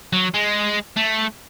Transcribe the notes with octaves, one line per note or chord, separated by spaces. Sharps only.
F#3
G#3
A3